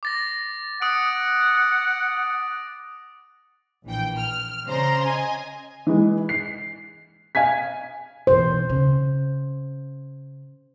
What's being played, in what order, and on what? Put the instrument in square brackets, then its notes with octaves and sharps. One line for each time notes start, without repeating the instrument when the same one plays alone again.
[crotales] D6 A6 A#6
[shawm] F#5 [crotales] D#6 D7
[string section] A#1 E3 G5
F6
C#3 C5 D5 A#5 C6
D#5 G#5
[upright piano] E3 G#3
C7
F5 G#5 G#6 B6
[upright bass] B1 E3 [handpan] C5
[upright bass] C#3